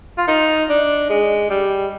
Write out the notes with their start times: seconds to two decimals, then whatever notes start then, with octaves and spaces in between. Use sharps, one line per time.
0.18 F4
0.28 D#4
0.69 D4
1.09 G#3
1.50 G3